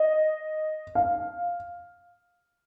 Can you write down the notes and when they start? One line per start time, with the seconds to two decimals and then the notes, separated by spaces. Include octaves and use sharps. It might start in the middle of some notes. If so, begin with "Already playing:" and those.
Already playing: D#5
0.95 F5